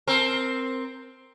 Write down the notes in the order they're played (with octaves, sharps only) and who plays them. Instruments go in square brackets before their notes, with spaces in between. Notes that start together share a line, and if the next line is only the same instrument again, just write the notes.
[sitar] C4 A#4